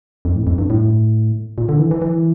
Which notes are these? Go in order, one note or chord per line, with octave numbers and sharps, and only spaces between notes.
F2
A2
F2
G2
A2
A#2
D3
E3
E3
E3